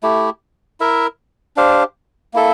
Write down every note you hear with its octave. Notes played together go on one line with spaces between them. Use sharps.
A3 E4 G4
E4 A#4 E5
D4 G4 C5 F5
A#3 E4 A4 E5